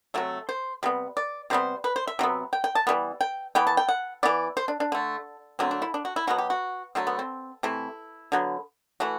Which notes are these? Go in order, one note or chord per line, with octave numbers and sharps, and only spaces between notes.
C3 F#3 A3 E5
C5
C3 G3 B3
D5
C3 G3 B3 C5
B4
C5
E5
C3 F#3 B3
G5
G5
A5
E3 G3 B3
G5
E3 B3 G5
A5
G5
F#5
E3 B3 D5
C5
D4
D4
D3 A3
D3 F#3 A3 C4
D4
E4
D4
F#4
E4
B2 F#3 B3 F#4
G4
F#4
D3 F#3 A3 C4
B3
C4
C3 E3 A3 E4
D3 F#3 B3
E3 A3 F#4